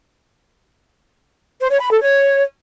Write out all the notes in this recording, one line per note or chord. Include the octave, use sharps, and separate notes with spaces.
C5
C#5
B5
A4
C#5